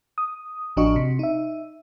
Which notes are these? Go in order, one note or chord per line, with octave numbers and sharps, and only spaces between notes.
D#6
A1 F3 D4 F#4 D#5 C#6
C3
D#4 E5